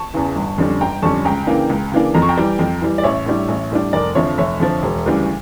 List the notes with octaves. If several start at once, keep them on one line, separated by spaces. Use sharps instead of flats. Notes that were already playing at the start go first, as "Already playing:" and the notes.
Already playing: A5 C#6
E2 C#3 E3
G1
F2 D3 G3 C#4
G1 G5 A#5
F2 D3 G3 C#4 A5 C#6
C#2 G5 A#5
C#3 E3 A#3 D4
C#2
C#3 E3 A#3 D4
F2 A#5
C#6
G5 A#5
E3 G3
F2
E3 G3
D5
A1 C#5 E5
A2 G3 D4
A1
A2 G3 D4
F1 A#4 D5
F2 D3 F3 C#5 E5
F1 C#5 E5
F2 D3 F3
E1
D2 C#3 E3 G3